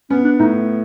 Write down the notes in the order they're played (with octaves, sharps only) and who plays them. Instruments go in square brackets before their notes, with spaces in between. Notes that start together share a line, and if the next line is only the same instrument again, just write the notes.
[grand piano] B3 [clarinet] C#4
[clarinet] D4
[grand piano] A2 [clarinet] D#4